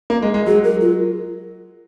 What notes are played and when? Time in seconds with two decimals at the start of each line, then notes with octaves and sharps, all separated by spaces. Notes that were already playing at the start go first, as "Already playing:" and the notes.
0.10 A#3
0.22 G#3
0.34 G#3
0.47 F#3 G#4
0.64 A#4
0.81 F4